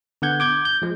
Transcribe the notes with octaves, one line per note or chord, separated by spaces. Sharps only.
D3 B3 F#5 G6 G#6
D6 G6 G#6
G6
F3 G#3